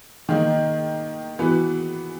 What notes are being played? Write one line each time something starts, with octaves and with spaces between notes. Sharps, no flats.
D#3 A#3 D#4
E3 B3 F#4